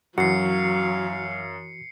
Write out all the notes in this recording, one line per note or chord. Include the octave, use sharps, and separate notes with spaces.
F#2 E3 F#3 F#4 F5 C7 C#7